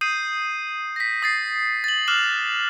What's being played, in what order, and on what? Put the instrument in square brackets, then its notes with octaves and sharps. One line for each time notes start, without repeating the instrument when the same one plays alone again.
[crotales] D#6 G6 C7 D#7
A#6 B6
D#6 A6 C7
A6 F#7
D6 F6 F#6 E7 F#7